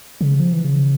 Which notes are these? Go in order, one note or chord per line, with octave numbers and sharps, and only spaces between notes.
C#3
F3
E3
C#3